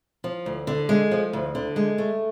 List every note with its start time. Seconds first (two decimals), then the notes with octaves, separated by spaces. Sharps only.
0.24 F3
0.46 D2
0.67 D3
0.89 G#3
1.11 F3
1.33 D2
1.55 D3
1.76 G#3
1.98 A3